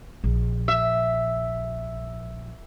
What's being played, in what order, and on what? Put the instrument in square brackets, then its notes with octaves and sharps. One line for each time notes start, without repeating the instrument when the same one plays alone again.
[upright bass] A#1
[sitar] E5